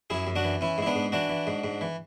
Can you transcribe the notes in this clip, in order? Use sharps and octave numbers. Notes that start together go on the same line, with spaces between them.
F#2 E4 G#4
F#2
D4 F#4
E3
E3 C#4 E4
G#2 E4
B3 D4
G#2
E3 D4 F#4
E3
G#2
G#2
E3